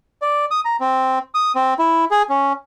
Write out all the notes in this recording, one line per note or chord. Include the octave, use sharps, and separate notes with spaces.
D5
D#6
A#5
C4
D#6
C4
E4
G#4
C#4